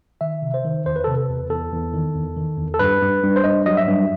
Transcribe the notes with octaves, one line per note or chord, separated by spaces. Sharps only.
D#3 E5
C3
C5
D#3
E2 C5
B4
C3 A4
B4
E2
E2 A4
E2
D#3
E2
D#3
E2
A4
G2 B4
G2
G2
C5
G2 D#5
F#3 D#5
E5
G2